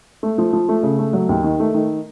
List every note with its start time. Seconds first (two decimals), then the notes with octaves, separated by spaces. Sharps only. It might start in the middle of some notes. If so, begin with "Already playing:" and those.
0.23 A3
0.38 F3
0.53 F3
0.69 A3
0.83 C#3
0.99 A3
1.13 F#3
1.29 D#2
1.44 D#3
1.60 A3
1.74 D#3